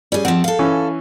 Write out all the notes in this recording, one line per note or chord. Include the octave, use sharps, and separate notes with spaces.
G3 C#4 G#4
F3 C4 F#5
A4 F5
E3 C#4